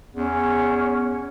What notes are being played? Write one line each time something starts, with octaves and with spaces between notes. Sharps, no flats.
E2 C#4